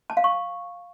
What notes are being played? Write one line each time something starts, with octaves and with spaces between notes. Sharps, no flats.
A5
F5
C#6